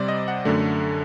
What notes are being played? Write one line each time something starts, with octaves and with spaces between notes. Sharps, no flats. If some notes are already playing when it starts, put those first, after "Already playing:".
Already playing: C3 G3 C5 D5
D#5
F#5
F#2 D3 A3